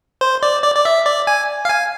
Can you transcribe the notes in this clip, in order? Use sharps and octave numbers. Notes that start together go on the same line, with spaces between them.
C5
D5
D5
D5
E5
D5
G#5
F5
G#5